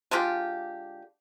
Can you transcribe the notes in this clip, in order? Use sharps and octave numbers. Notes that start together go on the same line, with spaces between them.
D3 G#3 F4 G4